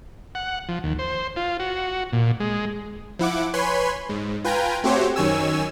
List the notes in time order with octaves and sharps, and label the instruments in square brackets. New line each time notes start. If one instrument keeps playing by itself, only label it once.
[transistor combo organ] F#5
F3
D#2
C5
F4
F#4
A#2
G#3
[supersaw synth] F3 E4 F#5 D6
B4 C#5 G#5 B5 C6
G#2
F4 B4 G5 G#5 A#5
A3 C4 F#4 G4 C5 C#5
F#2 D#3 C#5 G#5 E6